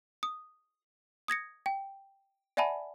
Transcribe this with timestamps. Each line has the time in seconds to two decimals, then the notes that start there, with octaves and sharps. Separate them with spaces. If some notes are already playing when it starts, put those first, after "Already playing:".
0.23 D#6
1.28 D#6 G#6 A#6 C#7
1.66 G5
2.57 D5 E5 F#5 G#5 A5 B5